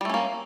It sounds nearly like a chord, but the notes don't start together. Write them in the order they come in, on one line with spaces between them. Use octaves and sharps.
G3 A3 C#4 A#3